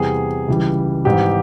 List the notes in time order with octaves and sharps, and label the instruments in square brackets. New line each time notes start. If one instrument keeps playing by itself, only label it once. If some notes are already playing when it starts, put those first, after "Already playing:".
Already playing: [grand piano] E2 C3 E3 G3 G#4
C#2 C#3 E3 G3
G#1 G#2 E3 G3 G4